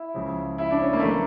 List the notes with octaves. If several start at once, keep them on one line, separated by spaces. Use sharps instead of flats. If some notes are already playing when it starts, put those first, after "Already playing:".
Already playing: E4
C#2 C#3 F3
E4
D4
C#4
A#3
A3
C#3 E3 A#3